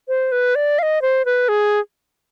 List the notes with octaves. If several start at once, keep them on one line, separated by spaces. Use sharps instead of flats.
C5
B4
D5
F5
D#5
C5
B4
G#4